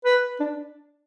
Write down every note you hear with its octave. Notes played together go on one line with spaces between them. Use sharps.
B4
D4